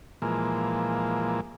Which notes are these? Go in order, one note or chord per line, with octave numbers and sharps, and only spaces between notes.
A#2 E3 F3 G#3 A#3